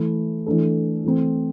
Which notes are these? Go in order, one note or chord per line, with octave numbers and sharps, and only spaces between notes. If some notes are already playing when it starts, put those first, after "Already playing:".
Already playing: E3 A3 E4
E3 A3 D4 A4
E3 A3 C4